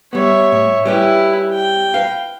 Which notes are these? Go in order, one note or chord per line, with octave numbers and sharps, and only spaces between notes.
G3 B3 C#5 E5
A2
G3 C#4 E4 G4 B4
G5
B4 F5